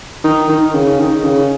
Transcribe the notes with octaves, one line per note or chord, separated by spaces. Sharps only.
D#3
D#3
C#3
D#3
C#3